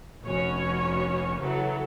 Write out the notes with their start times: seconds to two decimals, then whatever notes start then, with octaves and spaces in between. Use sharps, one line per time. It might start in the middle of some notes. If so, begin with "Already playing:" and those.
0.24 F1 C#4 F#4 C#5
1.39 C#3 E3 F#3 A4